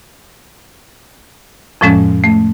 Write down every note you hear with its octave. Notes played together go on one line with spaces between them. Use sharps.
F2 A2 F3 G#3 C#4
A3